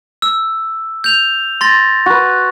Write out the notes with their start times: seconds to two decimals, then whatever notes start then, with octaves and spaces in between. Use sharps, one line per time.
0.22 E6
1.04 G6 F7
1.61 C6 A6 A#6
2.06 F#4 B4